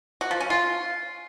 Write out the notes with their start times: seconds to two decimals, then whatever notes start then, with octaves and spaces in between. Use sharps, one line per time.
0.21 F#4
0.31 F3
0.40 C#4
0.50 F4